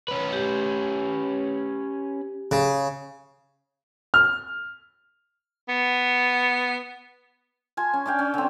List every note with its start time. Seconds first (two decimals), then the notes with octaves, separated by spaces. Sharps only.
0.08 C#4 B4
0.33 G4
2.51 C#3
4.14 F6
5.69 B3
7.77 F4 G#5 A5
7.93 C#4
8.06 D4 D5 F5 G5
8.19 C#4
8.34 D3 C4